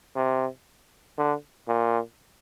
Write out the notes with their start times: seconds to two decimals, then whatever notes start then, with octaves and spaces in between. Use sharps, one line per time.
0.16 C3
1.18 D3
1.68 A#2